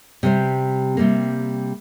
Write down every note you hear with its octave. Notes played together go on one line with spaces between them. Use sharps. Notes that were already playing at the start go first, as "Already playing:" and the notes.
C3 G3 C4
C3 G3 A#3